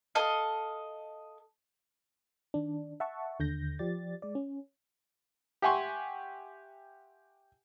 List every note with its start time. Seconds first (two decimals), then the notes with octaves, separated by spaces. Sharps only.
0.15 A4 D#5 F5
2.54 D#3 D4
3.00 E5 F#5 A5 C#6
3.39 D#2 D3 G6 A#6
3.79 F3 G4 D5 A6
4.22 G#3 D5
4.35 C#4
5.62 G4 E5 F#5 G#5 C6 C#6